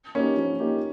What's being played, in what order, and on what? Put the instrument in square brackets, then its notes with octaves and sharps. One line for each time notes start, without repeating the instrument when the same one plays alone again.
[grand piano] A#3 D#4 G4 [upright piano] C#4
[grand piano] F3
A#3 D#4 G4